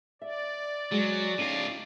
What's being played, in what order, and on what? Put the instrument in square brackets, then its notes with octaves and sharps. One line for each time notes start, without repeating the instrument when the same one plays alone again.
[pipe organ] D5 [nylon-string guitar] E5
[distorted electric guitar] F#3 [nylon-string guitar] G#3
[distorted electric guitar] A2 F5 [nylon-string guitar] C#4 D#4